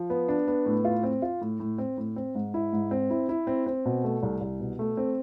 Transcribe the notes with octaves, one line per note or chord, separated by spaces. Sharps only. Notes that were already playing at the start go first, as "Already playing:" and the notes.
Already playing: F3
B3
D4
B3
A2
F4
C4
F4
A2
A2
C4
A2
C4
G#2
E4
G#2
C4
E4
E4
C4
C4
B2
A3
C2
C2
B2
A3
C4